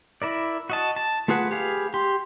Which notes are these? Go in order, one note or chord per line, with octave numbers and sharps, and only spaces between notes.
E4 A#4 D5
F#4 D#5 A5
A5
A3 F4 G#4 B4 F#5
G4 G#4 B4 F5
G4 C6